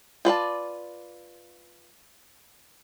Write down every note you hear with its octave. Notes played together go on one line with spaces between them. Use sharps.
F4 B4 D5 A5